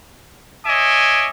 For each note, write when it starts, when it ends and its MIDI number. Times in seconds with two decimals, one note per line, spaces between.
0.65 1.29 73
0.65 1.29 75
0.65 1.29 76
0.65 1.29 80
0.65 1.29 86